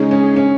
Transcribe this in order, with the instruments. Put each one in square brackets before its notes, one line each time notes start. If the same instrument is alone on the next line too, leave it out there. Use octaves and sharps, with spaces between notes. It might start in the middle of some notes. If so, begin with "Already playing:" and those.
Already playing: [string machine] C#3 G#3 D#4 G#4 [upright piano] C#4
[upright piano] C#4
C#4